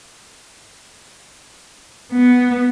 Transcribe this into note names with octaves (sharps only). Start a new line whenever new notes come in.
B3